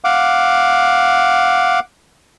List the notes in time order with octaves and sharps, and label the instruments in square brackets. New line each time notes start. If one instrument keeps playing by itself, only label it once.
[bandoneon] F5 F#5 D6